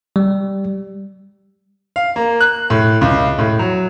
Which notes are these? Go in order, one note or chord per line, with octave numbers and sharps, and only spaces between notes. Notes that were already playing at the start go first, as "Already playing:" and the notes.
G3
F5
A#3
F#6
A2
C#2
A2
F#3